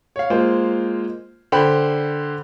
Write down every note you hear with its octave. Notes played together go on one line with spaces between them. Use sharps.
C#5 F5
G#3 A#3 F4 C5
D3 C5 G5 B5